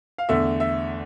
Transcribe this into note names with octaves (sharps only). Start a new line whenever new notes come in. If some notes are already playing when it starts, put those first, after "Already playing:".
F5
E2 D3 A3 E5
E5